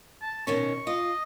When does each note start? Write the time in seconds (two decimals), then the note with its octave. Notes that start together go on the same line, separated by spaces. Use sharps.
0.22 A5
0.47 B2 D#3 C#4 C#6
0.87 F4 D#5